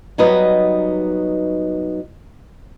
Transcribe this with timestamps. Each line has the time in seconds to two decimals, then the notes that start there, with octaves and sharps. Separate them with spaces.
0.18 F#3 G3 B3 D#4 B4 D#5